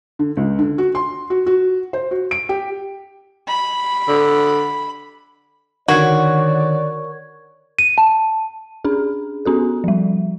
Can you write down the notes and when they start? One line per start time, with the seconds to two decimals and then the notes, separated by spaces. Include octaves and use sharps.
0.19 D3
0.37 C#2
0.59 D3
0.78 F#4
0.95 C6
1.30 F#4
1.47 F#4
1.93 C5
2.11 F#4
2.31 D7
2.49 G4
3.48 B5
4.08 D3
5.88 D3 D#3 F#4 A#4 C#5 D5 C#6 G#6
7.79 D#7
7.98 A5
8.84 C#4 D4 G#4
9.45 B3 C#4 F#4 A4
9.84 F3 G3